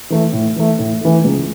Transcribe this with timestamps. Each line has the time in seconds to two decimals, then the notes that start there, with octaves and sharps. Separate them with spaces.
0.10 E3 A3
0.33 A2
0.56 E3 A3
0.79 A2
1.01 E3 A3
1.24 C#2